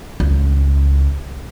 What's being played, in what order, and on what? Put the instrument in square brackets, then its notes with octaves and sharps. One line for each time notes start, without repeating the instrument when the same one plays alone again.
[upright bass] C#2